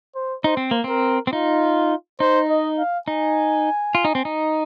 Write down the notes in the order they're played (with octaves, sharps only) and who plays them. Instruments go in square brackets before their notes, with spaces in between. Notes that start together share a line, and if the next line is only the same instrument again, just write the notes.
[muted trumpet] C5
[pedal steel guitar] D#4 [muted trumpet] C5
[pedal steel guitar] C4
A#3
[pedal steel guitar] C4 [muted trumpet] A#4
[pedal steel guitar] C4
[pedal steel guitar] D#4 [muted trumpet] F4
[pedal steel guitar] D#4 [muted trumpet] C5
[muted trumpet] D#5
F5
[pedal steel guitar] D#4 [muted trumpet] G#5
[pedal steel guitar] F4
D#4
C4
D#4